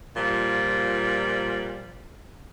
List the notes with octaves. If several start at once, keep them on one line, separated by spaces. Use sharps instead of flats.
A#2 F3 G3